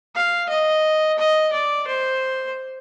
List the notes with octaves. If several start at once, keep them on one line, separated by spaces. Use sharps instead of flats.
F5
D#5
D#5
D5
C5